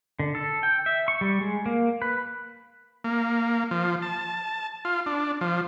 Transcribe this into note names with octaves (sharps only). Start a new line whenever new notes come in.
D3
A4
G5
E5
C#6
G3
G#3
A#3
B4
A#3
F3
A5
F4
D4
F3